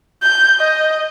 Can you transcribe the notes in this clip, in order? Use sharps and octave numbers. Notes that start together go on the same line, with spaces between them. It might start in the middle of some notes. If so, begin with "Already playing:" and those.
G6
D#5